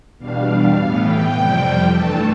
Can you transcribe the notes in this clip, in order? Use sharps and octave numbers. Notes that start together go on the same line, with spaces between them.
E2 B2 G3 D4 F5
A2 E3 B3
G5
F2 C3 G3
G2 E3 A3 A5